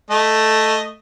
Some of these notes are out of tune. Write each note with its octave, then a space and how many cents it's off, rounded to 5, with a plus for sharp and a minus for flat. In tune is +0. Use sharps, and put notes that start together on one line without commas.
A3 +0 D#5 +0